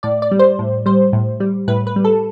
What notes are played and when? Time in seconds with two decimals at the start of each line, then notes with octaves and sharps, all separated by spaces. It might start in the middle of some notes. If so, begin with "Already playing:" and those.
0.03 A2 D5
0.22 D5
0.31 G3
0.39 C5
0.59 A2
0.86 G3 C5
1.13 A2
1.40 G3
1.68 A2 B4
1.87 B4
1.96 G3
2.05 A4